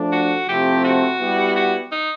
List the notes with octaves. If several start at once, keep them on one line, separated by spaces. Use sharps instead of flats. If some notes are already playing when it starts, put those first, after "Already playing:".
Already playing: F3 A3 D4
F#4
C3 F3 A3 C4 E4 G4
F#4
G3 B3 E4 G4
F#4
D#4